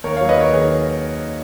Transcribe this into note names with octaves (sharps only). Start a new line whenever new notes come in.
D#2 A#4 C#5
C#5 F5
F#3
B4 D#5
D#2 A#4 C#5
D#3 G#4 B4